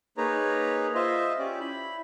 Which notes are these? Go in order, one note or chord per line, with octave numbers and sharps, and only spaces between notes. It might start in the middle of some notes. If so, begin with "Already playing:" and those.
A#3 D#4 G#4 B4 C#5 A#5
F4 C5 D#5 E5
C#4 G4 D5
E4 B5